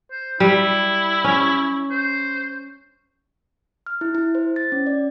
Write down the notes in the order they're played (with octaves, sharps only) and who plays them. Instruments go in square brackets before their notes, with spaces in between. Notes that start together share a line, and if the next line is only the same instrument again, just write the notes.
[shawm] C5
[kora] G3 [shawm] E4
[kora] C#4
[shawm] C5
[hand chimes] F6
E4
E4
C5
A6
C#4
D5